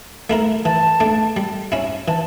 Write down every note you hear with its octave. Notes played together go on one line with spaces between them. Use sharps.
A3 E4 A#4
E3 A5
A3 D4
G3
C#4 E4
E3 A5